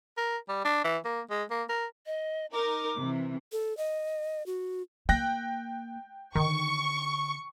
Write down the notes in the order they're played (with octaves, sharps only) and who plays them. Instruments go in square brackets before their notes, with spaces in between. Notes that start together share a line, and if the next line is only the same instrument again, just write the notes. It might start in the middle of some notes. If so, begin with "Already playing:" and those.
[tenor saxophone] A#4
G3
D4
E3
A#3
G#3
A#3
A#4
[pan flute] D#5
[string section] D#4 A#4 [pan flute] D6
[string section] C3 E3
[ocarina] A4
D#5
F#4
[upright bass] A#3 [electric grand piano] G5 F#6 A#6
[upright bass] D3 [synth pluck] D#3 [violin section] C#6